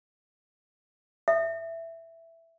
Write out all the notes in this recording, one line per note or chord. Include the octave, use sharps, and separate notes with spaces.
E5